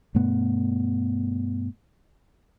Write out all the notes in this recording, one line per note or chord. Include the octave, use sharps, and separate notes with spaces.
G2 B2 A3 B3